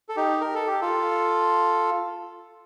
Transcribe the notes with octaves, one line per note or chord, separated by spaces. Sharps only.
A4
D#4 G4
A#4
A4
G4
F4 A4